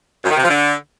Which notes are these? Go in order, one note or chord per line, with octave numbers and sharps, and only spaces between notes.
F#2
D#3
C3
F3
D3